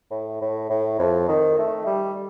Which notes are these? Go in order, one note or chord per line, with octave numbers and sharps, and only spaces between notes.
A2
A2
A2
F2
D#3
A3
G3